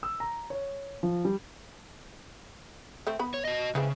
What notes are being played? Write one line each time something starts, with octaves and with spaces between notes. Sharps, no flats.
E6
A#5
C#5
F3
G3
A3 C4
B3 B5
C#5
F#4 D#5
C#3 E3 G#3 C4